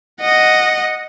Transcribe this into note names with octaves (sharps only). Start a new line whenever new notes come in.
D#5 F#5